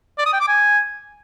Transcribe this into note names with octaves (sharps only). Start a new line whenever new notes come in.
D5
D#6
G5
D6
G#5